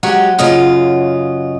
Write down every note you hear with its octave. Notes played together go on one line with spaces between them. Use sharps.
F#3 G#3 G4 F#5 C#6
F#2 C#3 F4 D#5